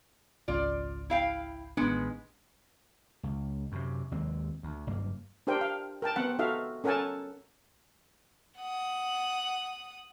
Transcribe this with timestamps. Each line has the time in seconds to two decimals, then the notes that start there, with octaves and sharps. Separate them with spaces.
0.48 G#1 C#2 F4 D5
1.10 E4 F5 G5
1.77 A1 D#3 G#3 B3 D4
3.23 C#2
3.72 F#2 C3
4.11 D#2 G#3 C4
4.63 D2
4.87 F#1 G2 A#3
5.47 D4 G4 A#4 C5 G5
5.61 F5
6.02 A#4 G5 A5
6.16 B3 C4 F#5
6.39 D#4 F#4 A4 E5 F5
6.84 C#4 A4 A#4 F#5 G#5 A5
8.59 F#5 D#6